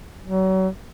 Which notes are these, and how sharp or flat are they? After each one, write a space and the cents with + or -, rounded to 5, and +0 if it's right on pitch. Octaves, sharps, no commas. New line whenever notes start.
F#3 +35